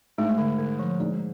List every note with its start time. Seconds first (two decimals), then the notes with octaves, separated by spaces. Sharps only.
0.18 G#2 A3
0.38 D3
0.59 D3
0.79 F3
1.00 G#2 D5